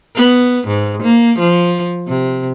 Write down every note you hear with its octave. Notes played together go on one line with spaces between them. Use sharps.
B3
G#2
A#3
F3
C3